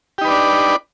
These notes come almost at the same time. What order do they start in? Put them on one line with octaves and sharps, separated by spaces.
G4 D#4 B4 D5 D4